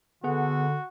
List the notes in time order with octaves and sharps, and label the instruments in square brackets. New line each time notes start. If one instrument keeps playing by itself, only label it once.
[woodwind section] D3 [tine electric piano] B3 G#4 F#5 [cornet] F#4